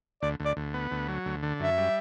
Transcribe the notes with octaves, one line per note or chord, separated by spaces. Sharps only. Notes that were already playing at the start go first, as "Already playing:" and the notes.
D2 D5
D2
D5
D2
B3
D2
F#3
D2
D3
F#2 E5
G3